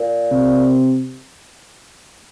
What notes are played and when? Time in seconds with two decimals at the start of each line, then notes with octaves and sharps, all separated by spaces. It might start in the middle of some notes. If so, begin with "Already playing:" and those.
Already playing: A#2
0.32 C3